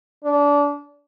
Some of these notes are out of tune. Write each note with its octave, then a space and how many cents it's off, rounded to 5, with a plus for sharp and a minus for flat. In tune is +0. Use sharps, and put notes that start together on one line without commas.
D4 -25